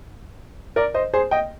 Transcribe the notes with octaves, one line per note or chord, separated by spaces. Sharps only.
A#4 D5
C5 D#5
G#4 C5
D#5 G5